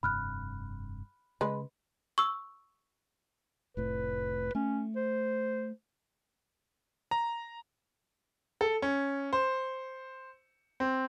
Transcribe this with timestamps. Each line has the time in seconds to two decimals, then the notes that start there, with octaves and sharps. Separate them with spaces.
0.03 F1 G2 C3 B5 F6 F#6
1.41 C#3 G#3 B4
2.18 C#6 E6
3.77 F1 A2 B4
4.55 A3 C#4
4.96 C5
7.11 A#5
8.61 A4
8.82 C#4
9.33 C5
10.80 C4